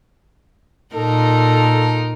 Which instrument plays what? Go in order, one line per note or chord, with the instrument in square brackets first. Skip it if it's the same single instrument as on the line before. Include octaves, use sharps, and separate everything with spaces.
[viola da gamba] A#2 D#4 A#4 [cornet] A4